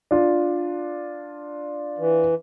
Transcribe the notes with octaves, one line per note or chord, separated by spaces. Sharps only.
D4 F4
E3